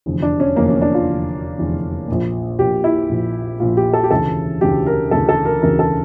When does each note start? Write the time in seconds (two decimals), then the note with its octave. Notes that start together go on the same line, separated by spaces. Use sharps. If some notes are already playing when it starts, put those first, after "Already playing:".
0.06 F1 E2 D3
0.22 D4
0.40 C#4
0.56 F1 E2 D3 A#3
0.69 C#4
0.82 D4
0.95 F4
1.07 F1 E2 D3
1.58 F1 E2 D3
2.08 A#1 A#2
2.59 A#1 A#2 G4
2.84 E4
3.09 A#1 A#2
3.60 A#1 A#2 F4
3.77 G4
3.93 A4
4.03 G4
4.11 E1 D2 C#3 E3 A4
4.61 E1 D2 C#3 E3 G4
4.87 A#4
5.11 E1 D2 C#3 E3 A4
5.29 A4
5.45 A#4
5.62 E1 D2 C#3 E3 A#4
5.79 A4